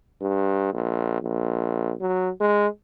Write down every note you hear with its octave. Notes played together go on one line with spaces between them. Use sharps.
G2
A#1
A#1
F#3
G#3